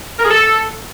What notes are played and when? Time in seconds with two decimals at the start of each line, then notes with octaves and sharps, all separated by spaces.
0.19 A#4
0.25 G#4
0.31 A4